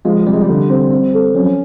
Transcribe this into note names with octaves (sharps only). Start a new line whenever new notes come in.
F3 G#3
C3 G3
G#3
G3
D3
C4
C4
A4
F#3 C#4
F3